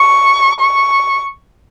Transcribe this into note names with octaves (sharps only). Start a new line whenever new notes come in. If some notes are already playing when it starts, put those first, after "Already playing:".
Already playing: C#6
C#6